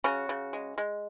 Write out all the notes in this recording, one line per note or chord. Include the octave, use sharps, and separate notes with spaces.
C#3 C#4 F#4
C#3
G#3
G#3